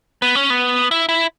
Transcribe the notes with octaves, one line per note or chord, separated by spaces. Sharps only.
B3
C#4
B3
E4
E4